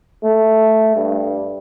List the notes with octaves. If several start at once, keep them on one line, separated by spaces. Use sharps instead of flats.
A3
G2